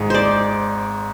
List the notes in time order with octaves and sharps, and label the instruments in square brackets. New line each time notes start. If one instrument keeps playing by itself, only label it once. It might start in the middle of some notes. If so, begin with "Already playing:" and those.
Already playing: [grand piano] G#1 G#2 [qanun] G#4
[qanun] C5 D5